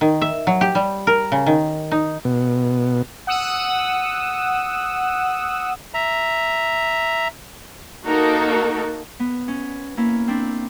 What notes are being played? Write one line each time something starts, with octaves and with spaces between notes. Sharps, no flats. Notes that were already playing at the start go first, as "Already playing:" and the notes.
D#3
E5
F#3
G4
G3
A#4
C#3
D#3
D#4
B2
F#5 D#6 E6
E5 A#5
A#3 D#4 F#4 A4 A#4
B3
C#4
A#3 C#4 E4
C4 D4 E4